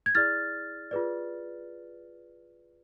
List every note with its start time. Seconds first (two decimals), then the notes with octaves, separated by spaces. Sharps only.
0.06 G#6
0.15 E4 G#4 D5 F6 A6
0.91 F4 G#4 B4 D5